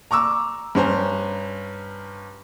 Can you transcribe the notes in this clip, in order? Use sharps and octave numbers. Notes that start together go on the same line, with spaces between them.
A#5 C#6 D6 E6
G2 C#4 C5 A#5